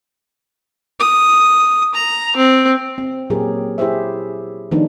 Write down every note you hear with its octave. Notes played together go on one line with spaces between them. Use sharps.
D#6
A#5
C4
C4
A#2 F#3 C#4 G4 G#4 A#4
E4 G4 G#4 C5 E5
D#3 F3 A3 B3 D4 D#4